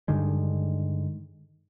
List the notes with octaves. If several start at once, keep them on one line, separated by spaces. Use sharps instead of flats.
G2 D3 D#3 G#3